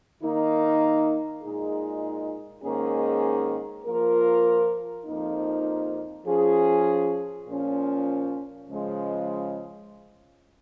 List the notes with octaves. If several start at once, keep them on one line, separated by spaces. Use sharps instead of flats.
D#3 A#3 D#4
A#2 G#3 D#4 G#4
G#2 D#3 A#3 C#4 G#4
F3 A#3 F4 A#4
F2 F3 A#3 D#4
F3 C#4 G#4
A#2 F3 C#4
C#3 F3 G#3